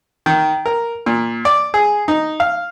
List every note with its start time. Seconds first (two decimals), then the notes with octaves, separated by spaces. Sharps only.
0.26 D#3
0.66 A#4
1.06 A#2
1.45 D5
1.74 G#4
2.08 D#4
2.40 F5